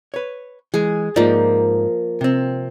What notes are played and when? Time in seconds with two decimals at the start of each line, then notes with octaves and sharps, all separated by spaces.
0.14 B4 C#5
0.74 E3 G#3 G#4
1.16 G#2 F3 A#3 D#4 D5
2.21 C3 C4